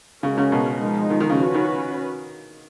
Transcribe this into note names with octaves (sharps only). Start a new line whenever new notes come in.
C#3 G#3 C#4 F#4 A#4
C#3
B2
F3 G#3 D#4
D#3
D#3
C#3
C#4 F#4 B4
D#3